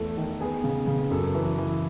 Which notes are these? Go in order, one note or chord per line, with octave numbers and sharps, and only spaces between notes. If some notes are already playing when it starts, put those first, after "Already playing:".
Already playing: E2 A3 A4
D#3
B3 G#4
C#3
C#3
F#2 A4
E3
E3